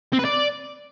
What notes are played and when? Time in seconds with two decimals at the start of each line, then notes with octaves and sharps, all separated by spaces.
0.13 C4
0.19 B4
0.25 D5